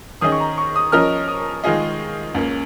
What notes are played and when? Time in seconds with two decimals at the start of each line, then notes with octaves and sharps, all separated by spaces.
0.21 D#3 C#4 G#4 D#5 D#6
0.32 C#6
0.40 A#5
0.58 C#6
0.76 D#6
0.92 F3 C#4 A#4 D#5 F6
1.28 D#6
1.64 D#3 G#3 F4 G#4 D#5
2.34 C#2 C#3 A#3